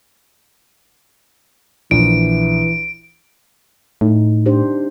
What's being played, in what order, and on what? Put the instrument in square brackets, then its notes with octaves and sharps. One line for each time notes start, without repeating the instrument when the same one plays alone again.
[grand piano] A#1 [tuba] E3 [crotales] D7
[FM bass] A2 [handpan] D#4
[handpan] D4 G4 C5